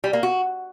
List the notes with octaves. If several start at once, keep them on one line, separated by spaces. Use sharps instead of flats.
G3
A#3
F#4